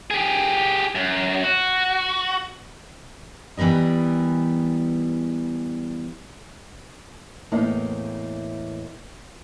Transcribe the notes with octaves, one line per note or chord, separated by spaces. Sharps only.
G4 G#4
F#2
F#4
E3 G3 B3 A#4 D#5
E2 A2 A#3 D#4